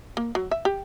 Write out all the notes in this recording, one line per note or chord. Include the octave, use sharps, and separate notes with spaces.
A#3
F#3
E5
G4